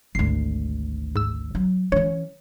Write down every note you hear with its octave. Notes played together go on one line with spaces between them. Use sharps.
G#1 D2 C7
G#2 E6
F#3
E3 C#4 C#5